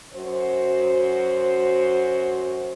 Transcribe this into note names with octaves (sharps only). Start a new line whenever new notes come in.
F#2 F#4 C5